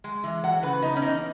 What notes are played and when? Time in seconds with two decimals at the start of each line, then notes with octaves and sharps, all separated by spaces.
0.04 G#3
0.24 E3
0.44 F#3 F#5
0.63 C#3 B4
0.82 B3 D#4
0.97 C#4
1.02 E3 D#4